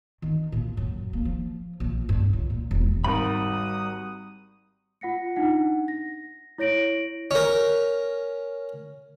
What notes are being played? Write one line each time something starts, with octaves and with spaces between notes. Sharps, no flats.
D#3
A#2
F#2
A#3
F3
A#1
G2
C#2
A#2
E1
G#1 G3 F#4 A#4 F#5 B5 D#6
F4 F#5 A#6 C#7
D4 D#4 F#5
A#6
E4 C#5 A#6 D7 F#7
C#4 A#4